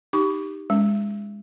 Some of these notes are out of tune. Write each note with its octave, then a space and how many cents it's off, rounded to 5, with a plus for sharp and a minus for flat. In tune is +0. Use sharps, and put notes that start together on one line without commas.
D#4 +0 G4 +0 C#6 +30
G#3 -15 C#4 +0